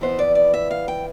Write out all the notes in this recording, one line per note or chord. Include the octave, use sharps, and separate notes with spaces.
F2 E3 B3 C5
D5
D5
E5
F5
G5